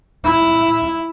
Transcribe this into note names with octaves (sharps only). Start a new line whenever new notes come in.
E4